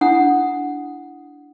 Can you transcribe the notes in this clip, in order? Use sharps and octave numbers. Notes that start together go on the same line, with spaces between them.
D4 E4 F#5 D#6